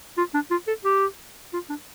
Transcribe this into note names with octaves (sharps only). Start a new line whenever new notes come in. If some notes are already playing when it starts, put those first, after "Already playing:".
F4
D4
F4
A4
G4
F4
D4